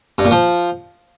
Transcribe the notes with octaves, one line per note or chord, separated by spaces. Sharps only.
G2
A#2
F3